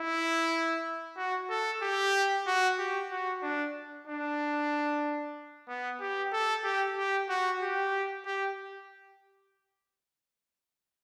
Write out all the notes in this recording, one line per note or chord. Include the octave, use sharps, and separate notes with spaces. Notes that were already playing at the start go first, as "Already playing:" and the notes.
Already playing: E4
F#4
A4
G4
F#4
G4
F#4
D4
D4
B3
G4
A4
G4
G4
F#4
G4
G4